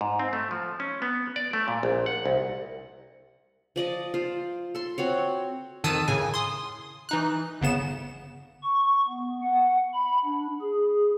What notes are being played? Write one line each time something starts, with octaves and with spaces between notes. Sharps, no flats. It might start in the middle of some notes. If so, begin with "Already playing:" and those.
G#2
C4
A3
F3
C#4
B3
D5
A3
A#2
A#1
F#5
C2
F3 D5 D#5
F4 C5
A4 C6
C4 F#4 C#5
F2 D#3 A5 D#6 E6 D#7
A2 C#3 G#5
C6 D#6
E3 D#4 F#6
G1 C#3 B3 E7
C#6
B3
F#5
B5
D4
G#4